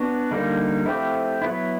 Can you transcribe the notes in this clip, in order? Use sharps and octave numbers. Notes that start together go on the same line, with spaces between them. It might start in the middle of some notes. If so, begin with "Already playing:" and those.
Already playing: B3 D4 F#4
D3 G3 A#3 D#4
F3 A3 C4 E4 G4
F#3 B3 E4